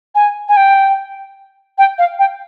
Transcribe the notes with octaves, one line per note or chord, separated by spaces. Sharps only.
G#5
G#5
G5
G5
F5
G5